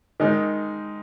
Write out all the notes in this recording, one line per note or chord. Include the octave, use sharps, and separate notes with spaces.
D#3 G#3 D#4